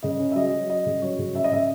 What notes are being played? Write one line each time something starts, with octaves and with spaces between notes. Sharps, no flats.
C#3 D#5
C#4
E5
F#3 D#5
F#3
C#4 D#5
C#3
F#3 C#5
C#3
C#3 E5
D#5
C#3 E5